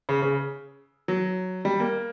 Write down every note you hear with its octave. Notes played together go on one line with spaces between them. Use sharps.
C#3
C#3
F#3
G3
A#3